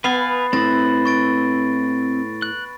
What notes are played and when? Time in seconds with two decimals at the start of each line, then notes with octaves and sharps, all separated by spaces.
0.04 B3 B4 F5 G#5 A6 C7
0.53 A2 C4 E4 A6 A#6
1.05 C#6 A6 D7
2.42 F#6